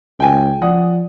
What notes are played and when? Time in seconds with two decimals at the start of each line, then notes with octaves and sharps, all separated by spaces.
0.20 C#2 G5 G#5
0.62 F3 D5 F#5 D#6